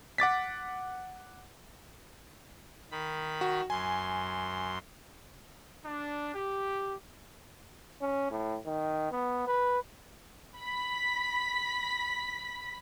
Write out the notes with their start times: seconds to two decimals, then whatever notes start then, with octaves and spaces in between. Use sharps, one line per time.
0.18 F#5 D6 A6 B6
2.91 D#3 B5
3.41 F#4
3.70 F#2 G#5 C6
5.85 D4
6.35 G4
8.01 C#4
8.31 A2
8.65 D#3
9.11 B3
9.47 B4
10.57 B5 B6